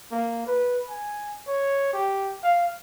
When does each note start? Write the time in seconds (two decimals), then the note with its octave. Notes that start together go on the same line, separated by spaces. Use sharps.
0.12 A#3
0.47 B4
0.89 G#5
1.47 C#5
1.93 G4
2.43 F5